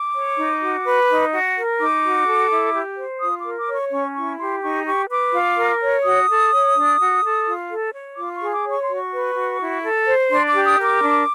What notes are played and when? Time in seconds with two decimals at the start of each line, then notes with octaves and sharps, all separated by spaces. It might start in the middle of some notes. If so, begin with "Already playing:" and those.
Already playing: D6
0.14 C#5
0.37 D#4
0.61 F#4
0.84 B4
1.09 D#4
1.32 F#4
1.55 A#4
1.79 D#4 D6
2.04 F#4
2.27 A4
2.50 E4
2.74 G4
2.97 C5
3.21 F4 D#6
3.38 D6
3.44 A#4
3.57 D6
3.68 C#5
3.74 C#6
3.91 C#4 C#6
4.16 E4 C#6
4.40 G4 C6
4.63 D#4 C#6
4.86 G4 C#6
5.10 B4 D6
5.33 F4
5.57 A#4
5.81 C#5
6.04 F#4 D#6
6.29 A4
6.53 C#5
6.75 D4
6.99 F#4
7.23 A4
7.47 F4
7.70 A4
7.93 C#5
8.17 F4 D6
8.35 C#6
8.42 G#4
8.53 D6
8.65 C#5
8.71 C#6
8.83 C6
8.89 F#4
8.95 C#6
9.12 B4
9.35 F#4
9.59 E4
9.83 A4
10.06 C5
10.30 D4 C6
10.48 D6
10.54 G4
10.66 D#6
10.78 A#4
10.83 D6
11.02 D4